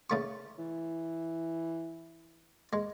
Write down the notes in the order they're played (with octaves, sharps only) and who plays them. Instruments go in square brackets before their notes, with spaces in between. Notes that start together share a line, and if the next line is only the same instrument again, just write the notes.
[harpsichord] C#3 A3 C#6
[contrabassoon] E3
[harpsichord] G#3